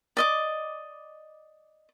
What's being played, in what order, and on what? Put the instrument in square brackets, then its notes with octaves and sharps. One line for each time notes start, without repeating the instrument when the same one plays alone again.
[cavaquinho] D5 D#5 D6